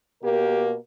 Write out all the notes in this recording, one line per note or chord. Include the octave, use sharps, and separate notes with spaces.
B2 A#3 G4 A#4